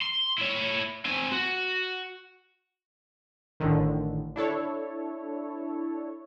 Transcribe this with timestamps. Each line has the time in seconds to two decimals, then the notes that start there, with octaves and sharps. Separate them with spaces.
0.02 C6
0.38 E4 C#5
1.05 C4 G#5
1.32 F#4
3.60 A1 A2 D3 D#3
4.36 D4 E4 A4 C#5